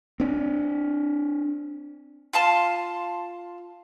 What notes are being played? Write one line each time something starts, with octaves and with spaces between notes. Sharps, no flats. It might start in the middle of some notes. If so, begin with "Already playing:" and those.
C4 D4
F4 F5 A5 C6